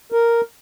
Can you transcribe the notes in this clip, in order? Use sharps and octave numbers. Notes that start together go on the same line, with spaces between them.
A#4